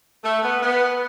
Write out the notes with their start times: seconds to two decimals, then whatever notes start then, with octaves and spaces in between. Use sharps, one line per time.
0.24 A3
0.43 B3
0.62 B3